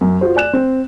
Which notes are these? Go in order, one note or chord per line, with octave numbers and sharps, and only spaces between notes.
F#2
F4 F#4 C5
D5 G#5 F#6 E7
C4